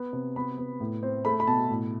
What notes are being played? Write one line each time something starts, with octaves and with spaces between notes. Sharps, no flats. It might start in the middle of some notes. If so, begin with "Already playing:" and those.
Already playing: B3
C3
B3 B5
B3
A2
C4
A3 B5
B5
B2 A5
A2